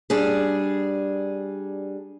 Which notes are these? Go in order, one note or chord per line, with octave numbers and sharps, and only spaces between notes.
G3 D4 G#4